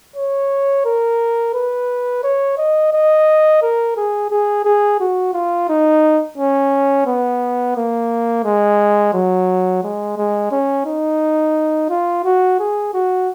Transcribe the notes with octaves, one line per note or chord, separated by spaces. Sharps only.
C#5
A#4
B4
C#5
D#5
D#5
A#4
G#4
G#4
G#4
F#4
F4
D#4
C#4
B3
A#3
G#3
F#3
G#3
G#3
C#4
D#4
F4
F#4
G#4
F#4